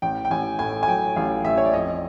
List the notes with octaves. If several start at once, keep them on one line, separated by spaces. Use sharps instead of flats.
A1 G5
G5
A1 G#5
A2 G#5
G#5
F#3 G5
A1 F5
A1 E5
C#5
D5
F2 D#5